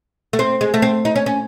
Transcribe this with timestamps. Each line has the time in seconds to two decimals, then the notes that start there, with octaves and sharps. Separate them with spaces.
0.33 A3
0.39 C4
0.61 G#3
0.74 A3
0.82 C4
1.05 D#4
1.16 C#4
1.26 C#4